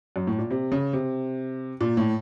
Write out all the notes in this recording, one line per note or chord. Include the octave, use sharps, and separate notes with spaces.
F#2
A2
A#2
C3
C#3
C3
A#2
A2